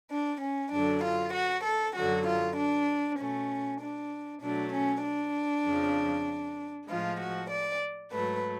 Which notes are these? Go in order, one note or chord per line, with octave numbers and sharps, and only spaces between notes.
D4
C#4
F#2 D3 F#3 D4
F4
F#4
A4
F#2 D3 F#3 F#4
F4
D4
B2 A3 C#4
D4
B2 F#3 A3 D4
C#4
D4
F2 C#3 F3
A2 F3 G#3 F4
F#4
D5
G#2 F#3 A3 B4